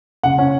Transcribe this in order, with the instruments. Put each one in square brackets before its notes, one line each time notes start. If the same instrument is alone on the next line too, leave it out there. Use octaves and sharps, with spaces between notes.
[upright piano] C#3 F#5
C#4